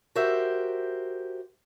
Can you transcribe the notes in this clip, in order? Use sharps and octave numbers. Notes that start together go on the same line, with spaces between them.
F#4 G4 A#4 C5 E5